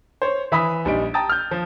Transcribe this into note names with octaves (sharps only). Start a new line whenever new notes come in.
C5 C#5
E3 E5 B5 D#6 B6
A#1 G3 D#4 D7
G5 A5 A#5 D#6 A6
F6 G6
F3